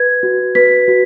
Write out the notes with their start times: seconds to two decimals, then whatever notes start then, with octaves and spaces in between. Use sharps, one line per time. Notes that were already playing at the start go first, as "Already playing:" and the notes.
Already playing: B4 G#6
0.23 F#4
0.55 B4 B6
0.88 F#4